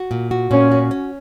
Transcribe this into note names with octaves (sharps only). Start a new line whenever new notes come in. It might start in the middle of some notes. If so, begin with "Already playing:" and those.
Already playing: F#4
A#2
F#4
A#2 C#4
F#4
C#4